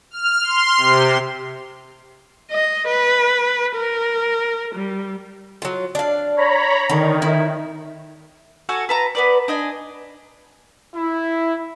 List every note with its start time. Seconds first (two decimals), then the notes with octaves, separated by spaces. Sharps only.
0.11 F6
0.43 C6
0.77 C3
2.51 D#5
2.87 B4
3.75 A#4
4.75 G3
5.62 F#3 F4
5.95 D4 F5
6.37 C#5 A#5 B5
6.90 D3 D#3
7.22 E4
8.69 F#4 A4 F#5 G#5
8.89 B4 A5 A#5
9.15 B3 B4 D5
9.48 D4 D#5 G#5
10.95 E4